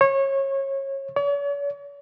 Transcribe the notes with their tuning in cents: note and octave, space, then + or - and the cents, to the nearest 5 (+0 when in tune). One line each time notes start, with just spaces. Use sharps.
C#5 -25
C#5 +45